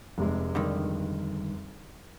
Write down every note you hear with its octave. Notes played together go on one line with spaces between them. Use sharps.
F1 C3 G#3
G2 D3 D#3